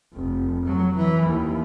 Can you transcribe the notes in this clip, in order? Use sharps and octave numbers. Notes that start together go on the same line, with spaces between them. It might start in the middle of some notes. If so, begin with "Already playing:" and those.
F1
F#3
E3
D#2